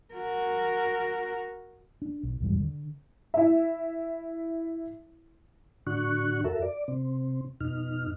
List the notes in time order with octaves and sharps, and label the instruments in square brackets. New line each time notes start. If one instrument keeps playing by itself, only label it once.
[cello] F#4 A#4
[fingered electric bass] D4
B1
B1 E2 G#2 G3
D3
[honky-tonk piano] E4 E5
[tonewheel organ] A2 D3 D4 F#4 C#6 F#6
F2 F#4 A4 A#4 E5
D5
C3 C4
F2 B2 D#4 F6